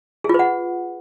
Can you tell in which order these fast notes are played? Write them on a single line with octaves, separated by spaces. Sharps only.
G#4 F4 B4 F#5